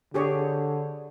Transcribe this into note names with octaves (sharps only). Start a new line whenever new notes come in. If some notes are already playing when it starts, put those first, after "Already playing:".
D3 G4 G#4 C#5